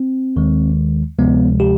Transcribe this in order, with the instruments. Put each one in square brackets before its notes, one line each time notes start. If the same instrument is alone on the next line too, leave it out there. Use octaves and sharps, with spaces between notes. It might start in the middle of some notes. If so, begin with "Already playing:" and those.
Already playing: [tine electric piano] C4
D#2 D#3 G#3
D2 C3 F3 G#3 B3
G4